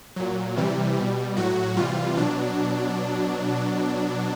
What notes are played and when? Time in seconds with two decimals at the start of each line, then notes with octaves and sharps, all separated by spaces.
0.16 A#2 F#3
0.57 C3 E3 G3
0.97 B2 G3
1.37 A2 F#3 F#4
1.76 C3 E3 G3 F4
2.17 B2 F#3 D4